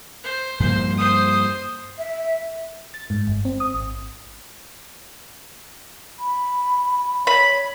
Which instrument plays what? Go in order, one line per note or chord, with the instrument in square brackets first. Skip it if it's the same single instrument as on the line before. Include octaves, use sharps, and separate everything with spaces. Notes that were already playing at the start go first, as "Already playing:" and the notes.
[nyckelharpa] C5
[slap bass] G2 F3 A#3 [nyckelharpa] C5
[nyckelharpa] C5 D#6
[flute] E5
[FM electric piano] A6
G#2
G1
C4
D#6
G#1
[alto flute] B5
[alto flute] C#5 [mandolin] B5